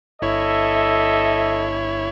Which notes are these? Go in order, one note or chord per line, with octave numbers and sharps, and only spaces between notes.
G1 E4 A4 C#5 D#5 E5